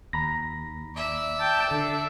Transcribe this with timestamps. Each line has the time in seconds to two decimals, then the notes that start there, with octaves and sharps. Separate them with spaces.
0.13 D#2 A#5 B5 A#6
0.95 D5 E5
1.39 G5 A5
1.71 D3 D4 A4